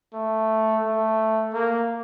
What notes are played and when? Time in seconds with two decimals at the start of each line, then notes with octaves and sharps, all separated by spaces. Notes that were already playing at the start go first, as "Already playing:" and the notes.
0.14 A3
0.83 A3
1.54 A#3